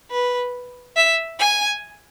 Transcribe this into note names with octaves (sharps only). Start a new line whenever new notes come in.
B4
E5
G#5